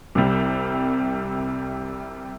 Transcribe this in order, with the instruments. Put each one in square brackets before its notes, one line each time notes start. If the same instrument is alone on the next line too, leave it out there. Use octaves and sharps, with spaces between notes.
[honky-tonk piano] C2 C3 G3